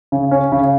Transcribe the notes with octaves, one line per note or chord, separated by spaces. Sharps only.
C#3
C#4
C#3